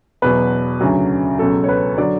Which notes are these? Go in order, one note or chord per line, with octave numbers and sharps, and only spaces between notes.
E2 B2 F#3 B4
D2 C#3 F#3
C#2 B2 F#3 A4
C#5
B4
D3 F#3 D5